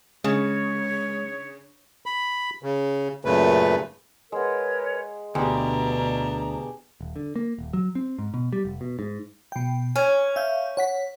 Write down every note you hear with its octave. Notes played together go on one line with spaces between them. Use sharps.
C#3 G#3 C#5
B5
C#3
F#2 A#2 C#3 A3 B4
G#3 A#4 B4 C#5 F#5
D2 B2 B3 D4 G4 G#4 A#5
D#1
D3
A#3
D#1
F#3
C4
G#2
B2
G3
F1
B2
G#2
B2 G5
C#4 G#5 G#6
E5 F5 G6
C#5 F#5 B6